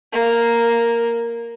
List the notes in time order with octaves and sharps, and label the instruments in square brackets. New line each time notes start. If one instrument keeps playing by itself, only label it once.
[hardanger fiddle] A#3